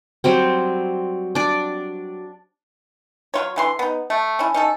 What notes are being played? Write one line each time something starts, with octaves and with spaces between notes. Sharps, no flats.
F#3 G3 C4
D4 D5
F#3 F4 C#5
D3 E3 C6
B3 D#4
A3
C#4 E4
C#4 D#4 A4